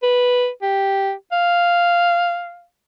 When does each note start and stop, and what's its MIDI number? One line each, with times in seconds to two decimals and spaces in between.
0.03 0.49 71
0.62 1.12 67
1.32 2.65 77